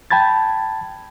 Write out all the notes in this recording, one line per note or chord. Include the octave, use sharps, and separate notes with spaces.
G5 A5 B5 G#6 A6